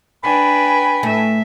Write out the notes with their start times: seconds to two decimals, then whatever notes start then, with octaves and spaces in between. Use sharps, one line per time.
0.23 D4 B4 G5 G#5 B5
1.03 A2 A3 E5